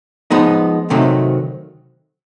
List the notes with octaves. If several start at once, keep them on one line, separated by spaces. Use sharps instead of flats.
F3 G#3 B3 D#4
C3 D#3 F#3 A3 C4